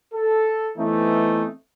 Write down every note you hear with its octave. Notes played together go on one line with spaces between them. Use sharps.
A4
E3 A3 B3 C4 D#4